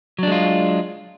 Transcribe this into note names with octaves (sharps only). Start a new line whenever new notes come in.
F#3 G#3 D4 F4